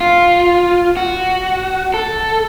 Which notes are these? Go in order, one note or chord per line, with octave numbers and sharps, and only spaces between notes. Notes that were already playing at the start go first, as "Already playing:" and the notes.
F4
F#4
A4